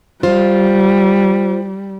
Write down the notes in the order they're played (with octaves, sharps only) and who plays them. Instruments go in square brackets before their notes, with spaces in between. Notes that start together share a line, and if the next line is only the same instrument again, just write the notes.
[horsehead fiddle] G3 [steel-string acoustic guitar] F4 C5